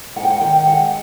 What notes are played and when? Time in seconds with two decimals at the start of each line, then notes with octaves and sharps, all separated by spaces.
0.16 G#2 F#5
0.23 G5
0.30 F#5
0.41 D#3 G5
0.67 G#3 F#5